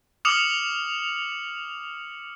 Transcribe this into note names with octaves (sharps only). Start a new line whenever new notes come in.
D6 D#6 F6 C#7 F7 F#7